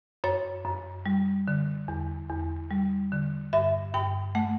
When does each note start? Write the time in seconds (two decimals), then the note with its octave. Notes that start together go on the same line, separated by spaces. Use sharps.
0.24 F#2 C#5
0.65 F#2
1.06 G3
1.48 D3
1.88 E2
2.29 E2
2.71 G3
3.12 D3
3.53 G2 E5
3.94 G2 G5
4.35 A3 F#5